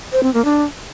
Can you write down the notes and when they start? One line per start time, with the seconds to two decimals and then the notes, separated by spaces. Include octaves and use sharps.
0.12 C5
0.23 C4
0.34 A#3
0.45 D4